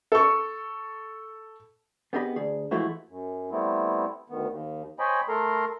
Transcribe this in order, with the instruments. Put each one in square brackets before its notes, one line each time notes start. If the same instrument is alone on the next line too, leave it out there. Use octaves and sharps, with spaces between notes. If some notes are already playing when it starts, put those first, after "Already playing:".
[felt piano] A4 C#6
[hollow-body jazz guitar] B3 C4 G4 G#4 D#5 B5
D2 G#4
E3 F3 G#3 A3 E4 F#4
[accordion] F#2
G3 A3 B3 C4 E4
D2 D#3 B3
D#2
C5 C#5 D#5 G5 G#5 B5
A3 A4 A#4 A#5 C6